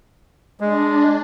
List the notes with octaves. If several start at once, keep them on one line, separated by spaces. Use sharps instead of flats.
G#3 D4